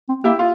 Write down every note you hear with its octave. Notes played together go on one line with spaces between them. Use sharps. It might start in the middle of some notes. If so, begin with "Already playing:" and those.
C4
A#3 E4 G4
F4